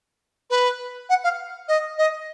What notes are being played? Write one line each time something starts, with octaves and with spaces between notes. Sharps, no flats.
B4
F#5
F5
D#5
D#5